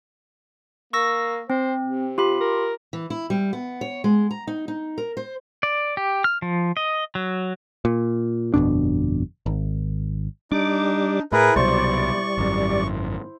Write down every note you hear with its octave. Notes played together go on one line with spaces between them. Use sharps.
A#3 C#6 E6 A#6
C4 C5
C3
F4 G4 B5
A#4
E3
E4
G3
B3
C#5
G#3
A#5
D#4
D#4
A#4
C5
D5
G4
F6
F3
D#5
F#3
A#2
G1 F2 B2 D4
G#1
G3 D4 D#4 D6
A2 E4 G#4 A#4 B4
C2 B2 F#3 G3 C5 D5 C#6
G#1 F#2